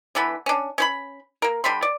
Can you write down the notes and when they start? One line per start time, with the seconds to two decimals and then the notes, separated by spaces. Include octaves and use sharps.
0.15 D3 E3 B3 B5
0.46 C#4 D4
0.78 C#4 C5 B5
1.42 A#3 A#4
1.64 D3 G3 B5 C6
1.82 D5